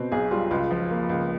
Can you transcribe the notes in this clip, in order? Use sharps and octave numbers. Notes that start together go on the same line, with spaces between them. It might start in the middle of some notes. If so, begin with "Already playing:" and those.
Already playing: B2 C4
B1 G#4
G3 F4
C#2 F4
F3
A#3
C#2